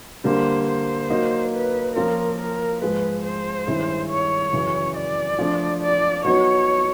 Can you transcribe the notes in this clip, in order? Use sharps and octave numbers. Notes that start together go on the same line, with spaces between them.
D3 G3 A#3 C5
C5
F#3 A#3 D#4
B4
F3 A#3 C#4 F4 A#4
A#4
G#2 F3 G#3 B4
C5
G2 D#3 G#3 C#4 E4
C#5
F#2 C#3 E3
D5
F3 A3 D4
D5
F#3 B3 D#4 C#5